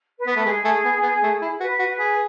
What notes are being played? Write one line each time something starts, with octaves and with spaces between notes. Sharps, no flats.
B4
B3
A3
G#3 G#4
A3
B3
B3
A3
E4
F#4 B4
F#4
G#4